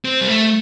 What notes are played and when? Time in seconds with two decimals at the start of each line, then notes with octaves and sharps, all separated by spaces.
0.05 C4
0.21 G3
0.28 A3